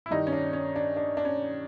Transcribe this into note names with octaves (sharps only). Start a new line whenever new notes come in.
E4
G2 D#3 G3 D#4
C#4
D4
C#4
D4
D4
D4
C#4